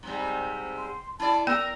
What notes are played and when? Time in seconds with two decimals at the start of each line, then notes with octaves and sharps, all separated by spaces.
0.03 G#2 C3 G3
0.77 C6
1.20 E4 D5 A5
1.47 B3 A#4 G5 E6